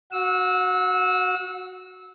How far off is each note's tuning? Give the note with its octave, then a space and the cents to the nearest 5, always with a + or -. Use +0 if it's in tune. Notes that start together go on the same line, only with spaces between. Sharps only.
F#4 +0 F#5 -35 E6 -20